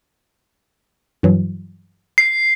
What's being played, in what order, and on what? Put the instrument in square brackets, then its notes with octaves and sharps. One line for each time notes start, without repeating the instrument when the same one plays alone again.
[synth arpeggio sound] G2 E3 F#3
[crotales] C7